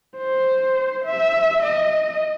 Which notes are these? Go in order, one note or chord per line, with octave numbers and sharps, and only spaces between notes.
C5
E5
D#5